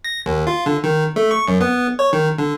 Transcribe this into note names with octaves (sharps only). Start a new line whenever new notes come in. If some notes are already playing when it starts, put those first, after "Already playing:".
A#6
D#2
F4
D3
D#3
A3
C#6
F#2
B3
C#5
D#3
D3